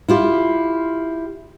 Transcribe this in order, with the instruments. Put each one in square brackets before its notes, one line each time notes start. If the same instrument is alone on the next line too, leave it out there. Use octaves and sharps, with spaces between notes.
[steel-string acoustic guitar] E4 F4 G4